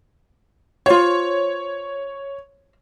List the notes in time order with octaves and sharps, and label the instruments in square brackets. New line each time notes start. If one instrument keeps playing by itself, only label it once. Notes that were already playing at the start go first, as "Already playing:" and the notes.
[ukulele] F4 C5 [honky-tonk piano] C#5